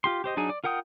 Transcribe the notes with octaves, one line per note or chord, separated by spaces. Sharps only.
F4 G4 C6
G4 C5 D#5
F#3 D4 D#4 G#4 G#5
D5
F4 A#4 F#5 G5 D#6